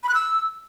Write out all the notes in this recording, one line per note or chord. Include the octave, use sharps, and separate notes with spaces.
B5
F#6
E6